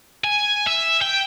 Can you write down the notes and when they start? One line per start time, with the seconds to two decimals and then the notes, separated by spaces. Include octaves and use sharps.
0.24 G#5
0.67 E5
1.02 G5